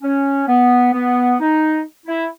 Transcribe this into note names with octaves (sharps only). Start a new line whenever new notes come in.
C#4
B3
B3
D#4
E4